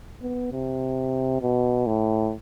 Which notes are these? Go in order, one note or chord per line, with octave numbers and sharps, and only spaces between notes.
B3
C3
B2
A2